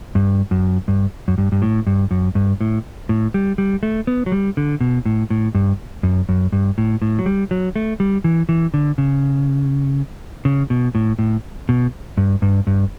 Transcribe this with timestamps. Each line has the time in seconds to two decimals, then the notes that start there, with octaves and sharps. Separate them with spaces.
0.15 G2
0.51 F#2
0.88 G2
1.28 F#2
1.38 G2
1.52 G2
1.62 A2
1.87 G2
2.11 F#2
2.35 G2
2.61 A2
3.09 A2
3.34 G3
3.58 G3
3.83 A3
4.07 B3
4.26 F#3
4.32 G3
4.57 D3
4.81 B2
5.06 A2
5.30 A2
5.55 G2
6.03 F#2
6.29 F#2
6.52 G2
6.78 A2
7.02 A2
7.19 F#3
7.26 G3
7.51 F#3
7.76 A3
8.00 G3
8.24 E3
8.49 E3
8.74 D3
8.98 C#3
10.45 C#3
10.70 B2
10.95 A2
11.19 A2
11.69 B2
12.17 G2
12.42 G2
12.67 G2